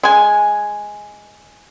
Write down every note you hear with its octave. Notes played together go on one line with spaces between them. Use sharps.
G#3 G#5